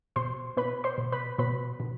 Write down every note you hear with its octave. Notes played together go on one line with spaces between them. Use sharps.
B2 C5 C6
B2 B4 B5
C5 C6
B2
B4 B5
B2 B4 B5
B2